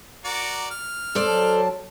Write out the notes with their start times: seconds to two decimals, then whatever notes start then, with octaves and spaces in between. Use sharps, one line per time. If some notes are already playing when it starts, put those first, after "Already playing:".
0.24 F#4 A#4 D5
0.71 F6
1.15 F2 A4 C5 D5
1.28 F#3 A5